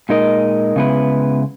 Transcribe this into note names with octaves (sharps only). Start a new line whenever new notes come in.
A#2 G#3 D#4 A#4 D#5
C#3 G#3 B3 E4 B4